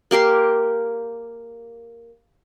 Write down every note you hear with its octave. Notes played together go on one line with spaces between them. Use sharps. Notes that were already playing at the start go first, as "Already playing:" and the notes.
A#3 G4 A#4 C6